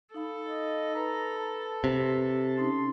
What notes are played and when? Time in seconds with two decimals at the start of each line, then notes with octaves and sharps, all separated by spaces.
0.14 D#4 A4 F5 B5
0.49 D#5
0.95 B4 A#5 B5
1.39 A5
1.84 C3
2.58 C#4 D#4 A5 C6